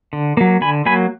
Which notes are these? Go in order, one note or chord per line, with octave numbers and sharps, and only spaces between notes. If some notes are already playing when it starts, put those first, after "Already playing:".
D3
F#3 A#3
D3 G#5 B5
F#3 A#3 G#5 B5